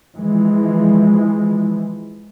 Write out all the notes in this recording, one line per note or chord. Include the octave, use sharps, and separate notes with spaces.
E3 F3 G#3